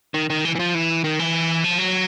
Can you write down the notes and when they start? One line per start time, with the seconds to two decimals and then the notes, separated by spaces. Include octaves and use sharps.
0.14 D#3
0.30 D#3
0.45 E3
0.55 E3
0.59 F3
0.75 E3
1.04 D#3
1.19 E3
1.64 F3
1.78 F#3